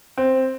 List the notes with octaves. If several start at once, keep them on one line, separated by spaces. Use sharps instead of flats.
C4